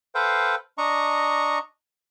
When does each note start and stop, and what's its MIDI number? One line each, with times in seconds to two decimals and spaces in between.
0.15 0.55 69
0.15 0.55 71
0.15 0.55 72
0.15 0.55 77
0.15 0.55 79
0.78 1.59 62
0.78 1.59 75
0.78 1.59 82
0.78 1.59 85